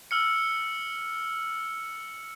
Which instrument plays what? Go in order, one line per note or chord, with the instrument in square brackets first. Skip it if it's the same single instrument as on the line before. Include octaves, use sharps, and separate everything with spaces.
[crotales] E6 F6 C#7